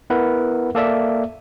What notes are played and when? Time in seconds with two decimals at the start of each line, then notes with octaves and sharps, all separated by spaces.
0.10 B3 E4 A#4 B4 F#5
0.75 A#3 A4 D5 E5